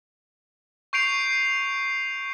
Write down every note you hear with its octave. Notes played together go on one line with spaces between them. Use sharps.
C#6 G6 C7 D7 F7